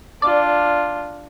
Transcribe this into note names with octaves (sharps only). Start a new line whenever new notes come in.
D4 F4 D5